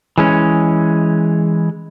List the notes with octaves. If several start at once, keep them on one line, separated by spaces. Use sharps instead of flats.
E3 G#3 C#4